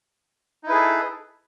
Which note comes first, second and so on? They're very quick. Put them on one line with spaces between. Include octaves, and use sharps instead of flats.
D#4 E4 B4 G#4 A4